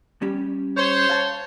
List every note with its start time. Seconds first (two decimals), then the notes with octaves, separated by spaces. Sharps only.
0.22 G3 C#4 G4
0.77 C5 C#5
1.09 F5 A5